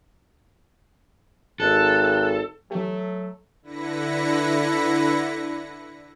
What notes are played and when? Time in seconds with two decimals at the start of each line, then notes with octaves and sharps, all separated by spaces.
1.60 G#1 A4 F#6
2.71 E3 F#3 A3 G4
3.62 D3 E4 B4 A#6 C#7